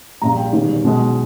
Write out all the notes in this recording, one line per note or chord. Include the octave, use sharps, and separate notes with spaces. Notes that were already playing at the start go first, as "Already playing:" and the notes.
A#1 A#2 G3 A#5
G5
E1 E2 D#3 G3
B1 B2 G#3